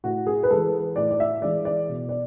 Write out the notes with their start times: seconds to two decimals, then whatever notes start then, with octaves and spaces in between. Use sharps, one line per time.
0.04 A2 F#4
0.27 G#4
0.43 B4
0.51 E3 G#3 A4
0.96 A2 D5
1.11 D5
1.20 E5
1.42 E3 G#3 D5
1.65 D5
1.88 B2
2.09 D5